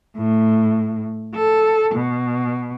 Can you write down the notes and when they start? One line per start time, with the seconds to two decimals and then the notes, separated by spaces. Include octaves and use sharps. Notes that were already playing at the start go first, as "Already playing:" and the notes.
0.16 A2
1.34 A4
1.95 B2